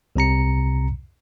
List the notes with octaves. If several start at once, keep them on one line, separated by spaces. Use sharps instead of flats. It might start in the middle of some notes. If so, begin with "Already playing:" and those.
C2 C3 A#5 C#7